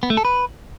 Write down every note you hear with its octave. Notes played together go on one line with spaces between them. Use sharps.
B3
A3
A4
B4